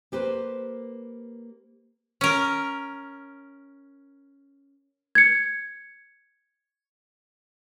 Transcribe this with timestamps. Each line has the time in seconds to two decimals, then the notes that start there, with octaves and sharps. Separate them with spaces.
0.12 A#3 G4 B4 C5
2.21 C#4 A#4
5.15 G#6 C#7